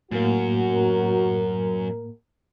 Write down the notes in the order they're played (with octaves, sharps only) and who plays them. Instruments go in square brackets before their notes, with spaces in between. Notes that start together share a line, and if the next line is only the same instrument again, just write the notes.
[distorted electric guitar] F#2 [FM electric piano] A2 A#3 [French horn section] F#4
[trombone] A#4